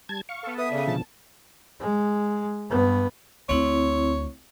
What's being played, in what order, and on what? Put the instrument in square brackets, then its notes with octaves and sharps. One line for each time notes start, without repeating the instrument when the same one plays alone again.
[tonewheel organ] G3 A5 G#6
F5 C#6
[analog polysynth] B3 A4
[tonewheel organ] B4 [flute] E5 [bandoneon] D#6
[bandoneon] C#3 [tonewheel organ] D5 D#6
[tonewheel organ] B2 D3 F3 [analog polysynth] A5
[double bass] G#3
G2 B3
[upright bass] D2 D3 [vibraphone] C4 E4 [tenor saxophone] C#5